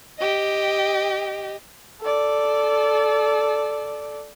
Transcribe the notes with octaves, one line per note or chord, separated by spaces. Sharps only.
G4 D#5
A4 D5